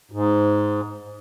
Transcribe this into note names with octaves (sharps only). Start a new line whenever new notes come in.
G#2